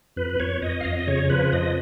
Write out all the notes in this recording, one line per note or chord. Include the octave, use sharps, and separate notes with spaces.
F2 B4
B4
F2 C#5
F2 D#5
F5
F2 D#5
D#5
C#3 C#5
F3 B4
F2 D#5